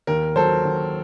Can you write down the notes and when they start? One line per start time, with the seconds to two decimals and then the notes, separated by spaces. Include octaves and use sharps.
0.07 D#2 A#4
0.36 F#3 A4 C5
0.65 D#2